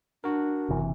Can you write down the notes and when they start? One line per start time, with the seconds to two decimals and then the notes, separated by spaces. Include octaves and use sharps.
0.24 D4 F#4 A#4
0.69 F#1 C3 E3